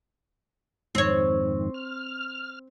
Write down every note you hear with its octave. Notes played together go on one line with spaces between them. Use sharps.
F2 G#2 D#3 C4 C#5
F6